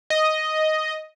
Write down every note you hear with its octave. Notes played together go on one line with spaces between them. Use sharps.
D#5